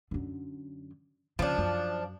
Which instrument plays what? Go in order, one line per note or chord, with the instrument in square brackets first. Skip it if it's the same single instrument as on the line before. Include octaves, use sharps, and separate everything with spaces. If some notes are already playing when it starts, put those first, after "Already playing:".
[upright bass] F#2 D3
[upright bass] C#3 [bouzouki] F3 D4
[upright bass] F#2